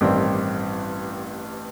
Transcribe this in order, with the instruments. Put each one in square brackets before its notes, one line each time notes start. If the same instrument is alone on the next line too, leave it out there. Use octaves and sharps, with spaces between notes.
[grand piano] A1 G2 D#3 C4 D5